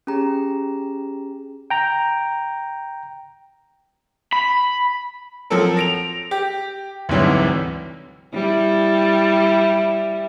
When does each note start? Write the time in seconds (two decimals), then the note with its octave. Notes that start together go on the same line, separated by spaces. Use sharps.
0.07 C#4 G4 G#4 A#5
1.70 G5 A#5
4.33 B5
5.50 F3 F#3 C4 A4 A#4
5.77 A#6 D7 F7
6.31 G4
7.09 D2 G#2 C3 E3 F#3 G3
8.34 G3 E4